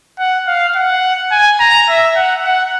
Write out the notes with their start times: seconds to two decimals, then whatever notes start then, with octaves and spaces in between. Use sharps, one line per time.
0.19 F#5
0.47 F5
0.76 F#5
1.32 G#5
1.60 A#5
1.89 E5
2.16 F#5
2.44 F#5